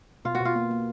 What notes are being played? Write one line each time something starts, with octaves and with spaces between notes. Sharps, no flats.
B2 F4
F#4
B2
F4
A#3
A#3